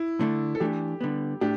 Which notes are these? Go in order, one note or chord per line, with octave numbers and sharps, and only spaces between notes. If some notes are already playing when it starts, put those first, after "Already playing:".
Already playing: E4
D3 A3 D4
A4
E3 A3 D4 G4
D3 G3 B3
A2 D4 G4